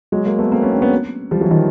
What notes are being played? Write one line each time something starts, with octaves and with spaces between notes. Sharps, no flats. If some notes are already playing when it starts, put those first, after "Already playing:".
F#3 G#3
G#3 A#3
A3 B3
A#3 C4
B3 C#4
C4 D4
B3 C#4
F3 G3
E3 F#3
D#3 F3